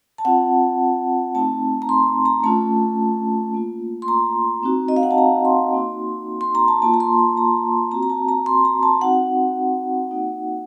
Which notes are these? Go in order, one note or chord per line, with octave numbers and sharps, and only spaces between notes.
A5
C4 F4 F#5
A3 C4 D#4 A5
A#5
C6
A#5
A3 C#4 F4 A5
A#3 F4
C6
A#5
C4 D#4 F#4
D#5
F5
F#5
A5
A#5
C6
A#3 D#4 F#4
C6
A#5
A5
A#3 F4 A5
A#5
C6
C6
A#5
C4 F#4 A#5
A#5
A5
A#5
C6
A#5
A5
C4 D#4 F#4 F#5
A#3 D#4 F#4